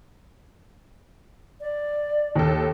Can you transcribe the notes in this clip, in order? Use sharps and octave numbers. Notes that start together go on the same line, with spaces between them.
D5
D#2 A4